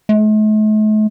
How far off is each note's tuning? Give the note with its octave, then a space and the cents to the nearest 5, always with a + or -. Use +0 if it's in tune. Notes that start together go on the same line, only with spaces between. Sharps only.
A3 -45